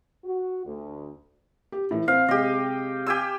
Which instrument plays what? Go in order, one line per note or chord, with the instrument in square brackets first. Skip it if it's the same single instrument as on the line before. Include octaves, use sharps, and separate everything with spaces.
[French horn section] F#4
D2
[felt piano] G4
A2 E3
[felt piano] C4 [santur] F5
[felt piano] C3 G#3 [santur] G4 D#5
[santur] G4 G#5 E6